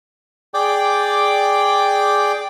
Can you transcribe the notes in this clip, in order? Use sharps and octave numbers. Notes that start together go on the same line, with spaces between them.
G#4 D5 G5 D6